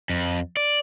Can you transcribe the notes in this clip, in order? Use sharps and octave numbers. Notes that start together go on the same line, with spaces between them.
F2
D5